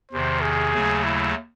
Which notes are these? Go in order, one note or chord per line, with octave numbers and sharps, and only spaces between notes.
E2 C3 D#3 C5
G#4
D#2 C#3 F#3 A3
E4